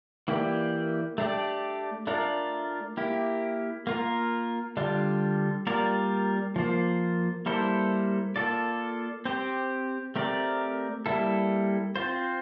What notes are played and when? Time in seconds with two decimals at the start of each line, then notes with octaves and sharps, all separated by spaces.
0.28 E3 A#3 E4 G4 D5
1.18 A3 D4 G4 D5
2.07 A3 D4 F4 A#4 D5
2.97 A#3 E4 G4
3.87 A#3 F4 A#4
4.77 D3 G3 D4 F4
5.67 G3 A#3 F4 A#4 D5
6.56 F3 A#3 F4 C5
7.46 G3 A#3 E4 A4 C5
8.36 A#3 F4 A4 D5
9.25 C4 G4 C5
10.16 A3 C4 G4 A#4 D5
11.06 G3 A#3 E4 A4
11.96 C4 F4 C5